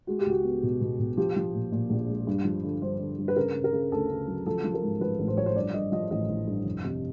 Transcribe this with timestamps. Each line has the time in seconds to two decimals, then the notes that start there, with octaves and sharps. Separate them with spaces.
0.07 G#3 F#4
0.19 G4
0.26 C#2 F#4
0.44 B3
0.63 B2
0.81 B2
1.00 B2
1.17 F3 G4
1.36 F3
1.54 A#2
1.72 A#2
1.90 A#1
2.09 G#3
2.27 G2
2.45 F3
2.64 D3
2.82 G2 C5
3.00 D3
3.18 G2
3.28 B4
3.36 C#3 A#4
3.55 C#3
3.64 A#4
3.73 C#3
3.92 D2 A4
4.10 C#3
4.27 F#3
4.46 F3 A4
4.64 F3
4.74 A#4
4.83 G#2
5.01 F3 B4
5.19 A1
5.28 C5
5.37 F3 C#5
5.46 C5
5.56 G2 D5
5.74 G2 D#5
5.92 F3 D#5
6.11 A1 D#5
6.29 A1
6.47 G2
6.66 F1
6.84 C3